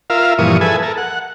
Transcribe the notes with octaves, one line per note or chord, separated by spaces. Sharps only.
F4 A#4 E5 F5
G2 A#2 E3 F3 C#6 D#6
G#4 A4 B4 E5 G#5
A4 A#4
F#5